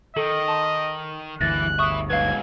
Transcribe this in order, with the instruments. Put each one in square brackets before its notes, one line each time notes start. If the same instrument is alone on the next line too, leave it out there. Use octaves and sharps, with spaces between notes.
[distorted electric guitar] D#3 [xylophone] A4 [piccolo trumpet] D#5
[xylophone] A5 C6
[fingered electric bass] G1 D2 [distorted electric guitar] E3 [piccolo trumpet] F#6 [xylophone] A6 A#6
[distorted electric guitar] B4 E5 [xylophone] C#6 D#6
[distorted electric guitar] G#2 F#3 [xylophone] B4 F5 [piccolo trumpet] G#6